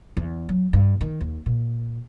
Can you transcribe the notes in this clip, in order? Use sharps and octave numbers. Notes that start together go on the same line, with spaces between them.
E2
F#3
G2
D#3
D#2
A#2